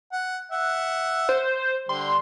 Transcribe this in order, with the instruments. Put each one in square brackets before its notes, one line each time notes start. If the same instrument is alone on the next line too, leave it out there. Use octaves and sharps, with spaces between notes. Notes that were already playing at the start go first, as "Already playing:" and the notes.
[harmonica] F#5
E5 F#5
[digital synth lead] C5
[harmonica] D3 G3 [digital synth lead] C6